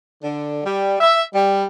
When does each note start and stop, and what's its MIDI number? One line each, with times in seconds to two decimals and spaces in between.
0.22 0.60 50
0.63 0.97 55
1.00 1.22 76
1.34 1.64 55